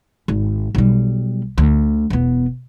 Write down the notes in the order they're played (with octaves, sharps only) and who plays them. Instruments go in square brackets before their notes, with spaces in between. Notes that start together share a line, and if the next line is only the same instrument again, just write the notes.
[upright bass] G#1
B1 G3
D2
E1 B3